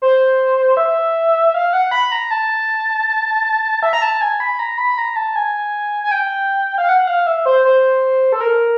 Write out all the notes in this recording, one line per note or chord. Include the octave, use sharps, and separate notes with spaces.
C5
E5
F5
F#5
B5
A#5
A5
E5
A#5
A5
G#5
B5
A#5
B5
A#5
A5
G#5
G#5
G5
F5
F#5
F5
E5
C5
C5
A4
A#4